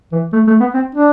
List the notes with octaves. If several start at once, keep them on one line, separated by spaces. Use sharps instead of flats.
E3
A3
A3
B3
C4
D4